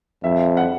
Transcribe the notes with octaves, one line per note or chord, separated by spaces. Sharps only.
F2 E5
F#5